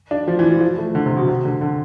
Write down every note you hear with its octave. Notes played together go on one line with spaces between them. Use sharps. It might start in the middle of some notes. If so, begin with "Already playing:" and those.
D4
F3
E3
F3
F3
A3
D3
C3
B2
C3
D3
D3